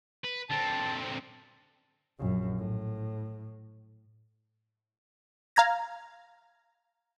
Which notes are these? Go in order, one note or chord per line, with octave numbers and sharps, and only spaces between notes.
B4
D3 C4 A5
A#1 F#2
A2
F5 A#5 G#6 A#6